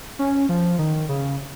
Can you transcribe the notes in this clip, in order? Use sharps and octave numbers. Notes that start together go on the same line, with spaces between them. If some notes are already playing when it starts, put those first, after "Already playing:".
C#4
F3
D#3
C#3